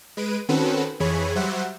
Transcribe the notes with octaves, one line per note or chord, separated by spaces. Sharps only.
G#3 B4 D7 D#7
D#3 C4 C#4 F#4 A4 B4
F2 E3 G#4 C#5 B5
F#3 G3 C5 E5 F#5